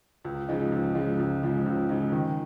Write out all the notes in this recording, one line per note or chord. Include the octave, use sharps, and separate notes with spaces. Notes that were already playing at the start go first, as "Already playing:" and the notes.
C#2
C#3 F3 G#3 D#4
C#2
C#3 F3 G#3 D#4
C#2
C#3 F3 G#3 D#4
C#2
C#3 F3 G#3 D#4
D#3